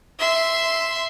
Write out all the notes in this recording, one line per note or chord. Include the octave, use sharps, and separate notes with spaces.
E5 C6